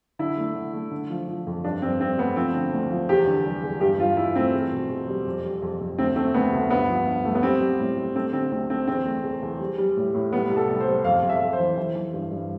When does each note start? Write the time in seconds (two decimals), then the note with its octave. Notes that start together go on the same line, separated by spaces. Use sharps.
0.19 D3 E4
0.37 A3
0.55 D3
0.73 A3
0.91 D3
1.10 F3
1.28 F3
1.47 F2
1.64 G2 D4
1.82 G2 C4
2.00 G2 C4
2.18 A3 B3
2.36 F3 C4
2.54 D3
2.73 D2
2.90 F3
3.09 E2 G4
3.27 D3
3.45 G3
3.63 E2
3.81 G2 G4
3.99 G2 F4
4.17 G2 E4
4.36 A3 C4
4.54 E2
4.72 B2
4.90 E2
5.08 G3
5.26 F2
5.44 G3
5.62 F2
5.80 F2
5.98 D2 C4
6.16 A3 C4
6.34 D2 B3
6.52 D2
6.70 G2 B3
6.89 F3
7.06 G2
7.25 A3
7.35 B3
7.43 G3 C4
7.60 G3
7.79 A2
7.97 G3
8.15 A3 C4
8.33 D3 C4
8.51 D2 C4
8.70 A3 C4
8.88 E2 C4
9.05 A3
9.24 E2
9.42 E2
9.59 G3
9.78 G3
9.96 A2
10.15 A2
10.32 G3 B3
10.50 C2
10.56 A4
10.69 G3
10.80 C5
10.86 G3
11.04 F2 F5
11.22 F2
11.29 E5
11.41 F2
11.53 C5
11.59 E3
11.78 E3
11.95 E3
12.14 G2
12.32 G2